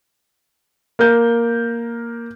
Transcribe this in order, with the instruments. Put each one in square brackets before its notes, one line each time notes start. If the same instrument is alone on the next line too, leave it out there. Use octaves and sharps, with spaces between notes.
[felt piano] A#3 A#4 G6